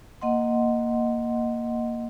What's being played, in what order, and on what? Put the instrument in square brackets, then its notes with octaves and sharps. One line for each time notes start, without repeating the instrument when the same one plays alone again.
[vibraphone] A#3 D#5 F#5 C6